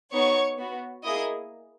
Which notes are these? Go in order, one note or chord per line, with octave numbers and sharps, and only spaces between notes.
B3 D#4 F#4 C#5 C#6
B3 F#4
A#3 E4 G#4 D#5 D#6